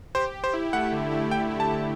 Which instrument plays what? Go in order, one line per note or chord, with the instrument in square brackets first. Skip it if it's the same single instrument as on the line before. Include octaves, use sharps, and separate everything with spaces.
[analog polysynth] G4 [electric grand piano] C5
[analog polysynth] G4
[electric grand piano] C5
[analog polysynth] E4
[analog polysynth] A3 [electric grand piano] F#5
[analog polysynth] D3
E4
[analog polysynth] A3 [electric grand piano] G5
[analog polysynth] E4
[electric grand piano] A5
[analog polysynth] E4